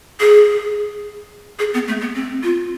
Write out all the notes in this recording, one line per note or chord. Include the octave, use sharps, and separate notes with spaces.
G#4
G#4
B3
A3
B3
C4
F4